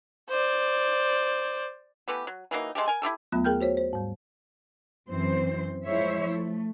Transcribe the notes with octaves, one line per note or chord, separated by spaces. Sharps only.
C5 D5
E3 A3 B3 G4
F#3
E3 F#3 A#3 D#4
G#3 A3 G4
A#4 G#5
E4 F4 G4 A4
D#2 F#3 A3 B3 F4 B5
G#4 A#4 G5 F6 G6
F#4 C5 C#5
C5
G#2 G3
F#2 E3 C4 C5
F3 G#3 E4 C5 C#5 E5
A3